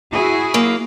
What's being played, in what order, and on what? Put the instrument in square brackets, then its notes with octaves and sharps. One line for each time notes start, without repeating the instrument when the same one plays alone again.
[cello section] E4 F#4 G#4
[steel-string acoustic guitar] F#2 A#3